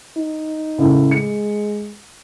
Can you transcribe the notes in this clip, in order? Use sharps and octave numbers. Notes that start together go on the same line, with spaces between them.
D#4
C#2 A2 C#3
G#3 C#7